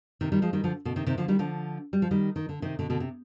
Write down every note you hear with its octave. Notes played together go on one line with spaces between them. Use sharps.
C3 D#3
D#3 G3
F3 G#3
D#3 G3
D3 F3
B2 D3
C3 D#3
C3 D#3
D3 F3
D#3 G3
D3 F3
G3
F3
D#3 G3
D#3
D3
C3 D#3
B2 D3
B2 D3
C3